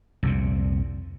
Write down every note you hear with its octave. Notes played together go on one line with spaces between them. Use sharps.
C2 F2 A#2